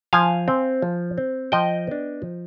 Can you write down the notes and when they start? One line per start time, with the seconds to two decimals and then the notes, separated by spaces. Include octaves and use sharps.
0.13 F3 F5 G#5
0.48 C4
0.82 F3
1.18 C4
1.52 F3 D#5 G5
1.87 B3 D4
2.22 F3